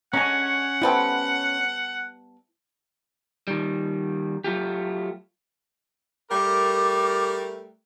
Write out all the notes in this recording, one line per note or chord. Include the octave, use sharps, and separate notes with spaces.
D3 G#3 C#4 C#5 F#5 G#5 A#5
G3 B3 E4 A4 C5 G5
D#3 G3
F#3 A3 F4 G4
G3 A3 A#4 D6